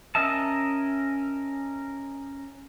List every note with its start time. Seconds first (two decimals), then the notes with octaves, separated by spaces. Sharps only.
0.15 C#4 A#4 D#5 E5 A5